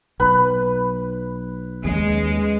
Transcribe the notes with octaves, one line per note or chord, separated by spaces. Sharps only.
B1 B4
D#2 G3 G#3 C#4